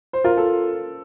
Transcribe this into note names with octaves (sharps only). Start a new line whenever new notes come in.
C5
F4 A#4
A4